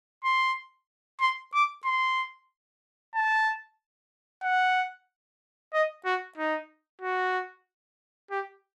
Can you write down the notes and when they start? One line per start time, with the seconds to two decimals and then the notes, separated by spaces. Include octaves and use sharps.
0.24 C6
1.20 C6
1.54 D6
1.85 C6
3.15 A5
4.43 F#5
5.73 D#5
6.05 F#4
6.37 D#4
7.01 F#4
8.31 G4